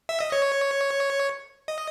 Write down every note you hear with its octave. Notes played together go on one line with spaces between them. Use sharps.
E5
D#5
C#5
D#5